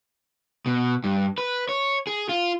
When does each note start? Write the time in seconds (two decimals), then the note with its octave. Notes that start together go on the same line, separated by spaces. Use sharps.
0.66 B2
1.04 G2
1.38 B4
1.69 C#5
2.07 G#4
2.29 F4